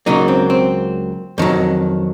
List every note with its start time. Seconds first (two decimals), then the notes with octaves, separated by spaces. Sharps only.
0.06 C#2 C#3 F#3 A#3 D#4
0.28 C4
0.50 C4
1.38 F2 D#3 F#3